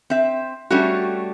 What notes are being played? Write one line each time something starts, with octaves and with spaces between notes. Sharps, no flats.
C4 E5
G3 A3 C#4 D4 F#4